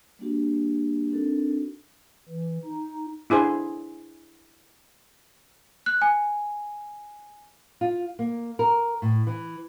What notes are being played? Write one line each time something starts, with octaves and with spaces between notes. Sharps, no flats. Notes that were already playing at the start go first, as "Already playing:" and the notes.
G3 A#3 D4 F#4 G4
C4 D4 D#4 F#4 A4 A#4
E3
D#4
D4 E4 G#4 C5
F#6
G#5
F4
A#3
A#4
A2
E3